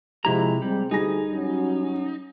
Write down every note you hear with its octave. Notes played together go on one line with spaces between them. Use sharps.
C3 F3 G#3 E4 G4 A#5
G3 G#3 C4
D2 G3 D#4 G#4 G#5 A#6
F#3 C#4